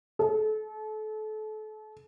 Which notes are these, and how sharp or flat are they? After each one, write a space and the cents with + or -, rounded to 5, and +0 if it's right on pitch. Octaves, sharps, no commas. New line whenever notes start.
A4 -35